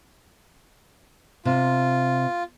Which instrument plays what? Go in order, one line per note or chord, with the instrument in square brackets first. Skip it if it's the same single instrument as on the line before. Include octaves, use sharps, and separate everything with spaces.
[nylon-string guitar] C3 [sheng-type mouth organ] F4